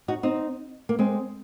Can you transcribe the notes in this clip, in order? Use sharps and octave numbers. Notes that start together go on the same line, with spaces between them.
D#4 F#4
C4 D#4
A#3
G#3 C4